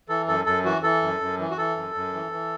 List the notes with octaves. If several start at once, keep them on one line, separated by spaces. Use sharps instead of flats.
E3 A4
F#2 A4
F#2 A4
E3 F#4
E3 A4
F#2
F#2
E3
F#4
E3 A4
F#2
F#2
E3
E3